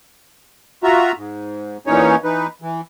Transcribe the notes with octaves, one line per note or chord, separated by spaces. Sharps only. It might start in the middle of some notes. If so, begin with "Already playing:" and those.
F4 F#4 E5 A#5
G#2
E2 A#2 E3 C#4 D#4 C#5
E3 D#4 B4
E3